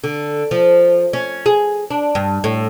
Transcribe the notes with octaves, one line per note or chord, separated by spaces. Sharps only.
D3
F3
C#4
G#4
D4
G2
A2